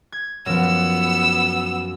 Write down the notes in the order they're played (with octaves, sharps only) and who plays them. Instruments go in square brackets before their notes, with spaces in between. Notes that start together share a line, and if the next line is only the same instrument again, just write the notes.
[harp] G#6
[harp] F#2 F3 [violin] B3 E6